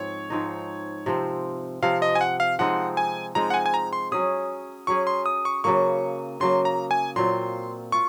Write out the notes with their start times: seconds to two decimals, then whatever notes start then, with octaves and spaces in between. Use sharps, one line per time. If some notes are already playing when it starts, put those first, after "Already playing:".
Already playing: G#2 F3 C4 C#5
0.30 G#2 F3 C4 D#4
1.06 C3 F3 C4
1.82 C3 F3 C4 F5
2.02 D#5
2.15 G#5
2.21 F#5
2.40 F5
2.59 F3 G#3 C4 D#4 F#5
2.97 G#5
3.35 F3 G#3 C4 D#4 A#5
3.50 F#5
3.54 G#5
3.66 G#5
3.74 A#5
3.93 C6
4.12 F#3 C#4 G#4 D#6
4.87 F#3 C#4 G#4 C#6
5.07 C6
5.26 D#6
5.45 C#6
5.64 C#3 F#3 A#3 C#6
6.40 C#3 F#3 A#3 C6
6.65 A#5
6.91 G#5
7.16 A#2 F#3 C4 F4 C6
7.92 F4 C#6